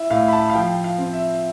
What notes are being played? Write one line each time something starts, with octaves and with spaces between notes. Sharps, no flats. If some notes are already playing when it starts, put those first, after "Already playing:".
Already playing: E4 E5
A2 F5
B5
A5
F5
F3 G5
F5
C4
E5